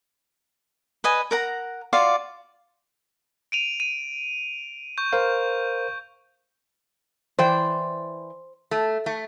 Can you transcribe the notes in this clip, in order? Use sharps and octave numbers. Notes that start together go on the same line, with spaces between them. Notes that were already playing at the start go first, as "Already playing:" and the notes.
B4 D#5 G#5
A#4 F#5 A#5
F4 F#4 D5 F5
D7 D#7 F7
D#7
C#6 G6
A#4 C5 F5
E3 C5 D5 G5
A3
A3